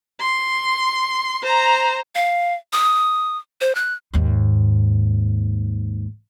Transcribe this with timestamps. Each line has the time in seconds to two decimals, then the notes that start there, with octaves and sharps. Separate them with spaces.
0.20 C6
1.43 C5 A#5
2.15 F5
2.73 D#6
3.61 C5
3.75 F#6
4.14 D#2 G#2